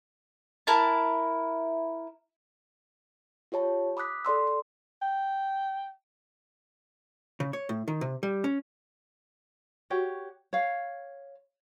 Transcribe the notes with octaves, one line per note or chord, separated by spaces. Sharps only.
E4 A#4 A5
F4 G4 C#5 A5 B5
B5 D6 D#6 F#6 B6
A4 D5 C6 E6
C6
G5
C#3
C#5
A2
D#3
C3
G3
C#4
F#4 G4 C#5
C#5 F5